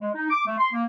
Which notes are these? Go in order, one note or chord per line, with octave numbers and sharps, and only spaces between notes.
G#3
D#4
D6
A3
C6
A#3